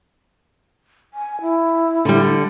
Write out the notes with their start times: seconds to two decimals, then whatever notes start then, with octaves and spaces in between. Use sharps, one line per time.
1.14 G#5
1.41 E4
2.05 D3 G3